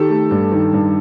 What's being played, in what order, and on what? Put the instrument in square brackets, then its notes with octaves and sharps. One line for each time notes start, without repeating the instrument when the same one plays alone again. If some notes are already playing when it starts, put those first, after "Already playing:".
Already playing: [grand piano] D#3 G4 A4
A3
G2
D#3
G2